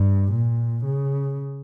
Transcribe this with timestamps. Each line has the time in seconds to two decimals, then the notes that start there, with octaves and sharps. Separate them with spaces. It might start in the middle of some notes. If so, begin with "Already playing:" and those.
Already playing: G2
0.31 A#2
0.84 C#3